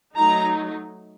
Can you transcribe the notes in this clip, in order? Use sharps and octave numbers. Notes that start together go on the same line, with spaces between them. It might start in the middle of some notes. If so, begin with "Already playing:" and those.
F#3 A3 D#4 A#5